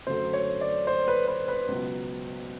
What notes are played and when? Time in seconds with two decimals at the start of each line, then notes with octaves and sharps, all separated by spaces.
0.07 F#2 D3 F#3 A3 C5
0.33 C#5
0.61 D5
0.87 C5
1.08 B4
1.27 B4
1.48 B4
1.68 C#2 B2 F#3